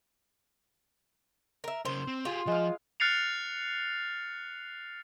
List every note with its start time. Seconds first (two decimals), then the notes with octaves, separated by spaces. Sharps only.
1.64 A#4 E5
1.85 C#3 A#4 C5
2.08 C4
2.25 F4 G4 G#4
2.47 F3 G#3 F5
3.00 F6 F#6 A6 C7 C#7 F7